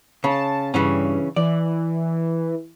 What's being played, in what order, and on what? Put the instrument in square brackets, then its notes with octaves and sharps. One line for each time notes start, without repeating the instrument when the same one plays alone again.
[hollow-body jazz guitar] C#3 [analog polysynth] A5
[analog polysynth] G2 [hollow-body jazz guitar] C#3 E3 C#4
[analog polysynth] E3 [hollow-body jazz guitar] D5